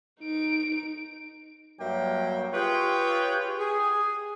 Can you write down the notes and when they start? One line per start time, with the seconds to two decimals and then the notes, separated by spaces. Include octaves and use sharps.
0.21 D#4 D7
1.80 G2 F#3 A#3 E5 G5
2.53 F4 G4 G#4 B4 C#5 G5
3.59 G#4